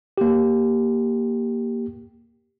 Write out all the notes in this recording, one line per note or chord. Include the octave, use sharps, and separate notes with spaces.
A#3 G4